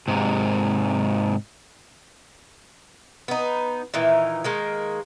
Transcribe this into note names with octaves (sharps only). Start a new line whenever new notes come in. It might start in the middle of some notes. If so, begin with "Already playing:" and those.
G#2 C3
B3 D#4
A#2 D#3 E3 D#4
D#3 G#3 A#3